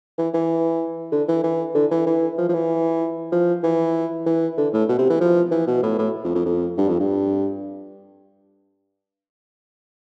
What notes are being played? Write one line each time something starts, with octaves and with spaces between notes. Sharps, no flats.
E3
E3
D3
E3
E3
D3
E3
E3
F3
F3
E3
F3
E3
E3
D3
A2
B2
C3
E3
F3
E3
B2
A2
A2
F2
F2
F2
G2
F2
G2